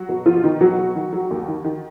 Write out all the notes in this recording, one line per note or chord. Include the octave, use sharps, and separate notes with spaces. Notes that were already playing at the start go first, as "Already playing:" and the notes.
Already playing: F#3 F#4
B2
B2 F3 F4
B2 D#3 D#4
B2 F#3 F#4
F#3
D#3
F#3
D#2
D#3
D#3